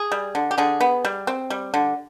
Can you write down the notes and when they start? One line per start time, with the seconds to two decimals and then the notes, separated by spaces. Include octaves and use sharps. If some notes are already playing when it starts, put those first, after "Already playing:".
Already playing: G#4
0.12 G3
0.35 D3
0.51 G4
0.58 D3 G#4
0.80 B3
1.05 G3
1.27 C4
1.50 G3
1.74 D3